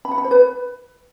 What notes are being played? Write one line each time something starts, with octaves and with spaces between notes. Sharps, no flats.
B5
F#5
B5
C5
B4